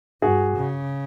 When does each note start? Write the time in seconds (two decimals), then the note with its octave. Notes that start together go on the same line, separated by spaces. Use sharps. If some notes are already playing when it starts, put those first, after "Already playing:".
0.22 G2 F#4 G#4
0.56 C#3